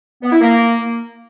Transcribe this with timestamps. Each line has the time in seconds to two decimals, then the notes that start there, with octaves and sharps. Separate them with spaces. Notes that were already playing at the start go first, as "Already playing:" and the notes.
0.23 B3
0.32 E4
0.41 A#3